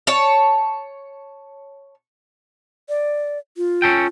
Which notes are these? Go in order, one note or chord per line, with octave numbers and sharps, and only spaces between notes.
C#5 A5
D5
F4
C#4 A4 G5